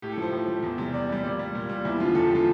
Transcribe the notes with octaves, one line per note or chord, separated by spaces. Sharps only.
A2 G4
A4
F3 C5
A2 C5
F3
E2
C3 G3
E2 D5
C3 G3
A#2 D5
G3
A#2
G3
E2 E4
D3 F3 F4
E2 A4
G4
D3 F3 F4